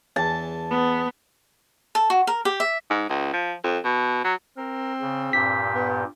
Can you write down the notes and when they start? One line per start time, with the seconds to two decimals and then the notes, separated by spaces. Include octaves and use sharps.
0.16 E2 A5
0.70 B3
1.95 A4
2.10 F#4
2.27 A#4
2.45 G4
2.60 E5
2.90 G#2
3.09 C#2
3.33 F3
3.64 F2
3.85 B2
4.25 F#3
4.57 C4 A#4
5.01 C#3
5.33 G2 A#2 G4 B6
5.75 B3